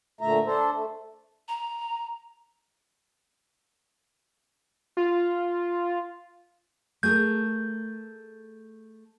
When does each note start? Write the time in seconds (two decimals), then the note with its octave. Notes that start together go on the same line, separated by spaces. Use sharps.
0.21 A#2 D3 A3 E5 A#5
0.46 D4 A4 C5
0.73 A3
1.48 A#5
4.97 F4
7.03 A3 G#4 A#4 G6